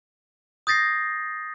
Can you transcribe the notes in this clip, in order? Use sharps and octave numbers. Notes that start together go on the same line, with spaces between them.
D#6 G6 A6 A#6 C7